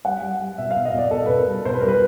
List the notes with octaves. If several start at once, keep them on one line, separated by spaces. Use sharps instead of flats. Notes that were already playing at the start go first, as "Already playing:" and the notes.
G3 F#5
G3
G3
B2 E5
F5
B2
D#5
B2 D5
B2 A4
B2 B4
A#4
G3
B2 C5
B4
G3 A#4
B4